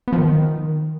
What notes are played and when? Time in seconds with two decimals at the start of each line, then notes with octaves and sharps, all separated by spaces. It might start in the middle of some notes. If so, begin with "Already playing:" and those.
0.08 B3
0.13 F3
0.18 D#3